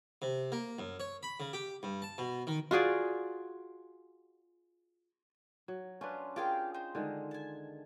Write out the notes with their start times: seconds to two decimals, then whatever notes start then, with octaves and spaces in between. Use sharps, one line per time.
0.22 C3
0.52 A#3
0.79 F#2
1.00 C#5
1.23 B5
1.40 C#3
1.53 G4
1.83 G2
2.02 A5
2.18 B2
2.47 D#3
2.71 F4 F#4 G#4 D5
5.68 F#3
6.01 C#4 D4 F4 B4
6.36 F4 G4 G#4 A#4 F5 G5
6.74 D#4 C5
6.95 D3 D#3 G#3
7.31 G#5 A5